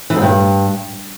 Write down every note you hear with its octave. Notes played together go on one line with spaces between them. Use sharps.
E3
G#2
G2